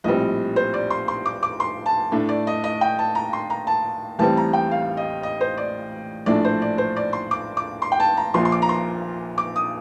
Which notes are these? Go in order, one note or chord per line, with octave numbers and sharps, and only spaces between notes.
A#1 A2 G3 C4 D#5
C5
D5
C6
C6
D6
D6
C6
A5
A2 A3 D4
D5
D#5
D#5
G5
A5
A#5
C6
A#5
A5
A1 A2 G3 C4 A5
A#5
G5
F5
D#5
D#5
C5
D5
A#1 A2 A3 D4 D5
C5
D5
C5
D5
C6
D6
D6
C6
G5
A5
A#5
A#1 A#2 F3 C6
C6
D6
A#5
C6
D6
D#6